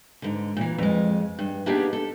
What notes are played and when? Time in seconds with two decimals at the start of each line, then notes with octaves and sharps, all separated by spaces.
0.22 G#2 D3
0.57 A#2 E3
0.78 F2 G#3
1.39 G2
1.66 A#3 B3 D4 D#4 G4 G#4
1.93 A4